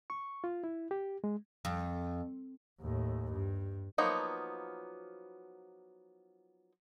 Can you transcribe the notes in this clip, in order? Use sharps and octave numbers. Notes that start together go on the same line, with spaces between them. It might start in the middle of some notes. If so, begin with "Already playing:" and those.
C#6
F4
E4
G4
G#3
F2
D#2 A2
G2
F3 F#3 A#3 B3 D#4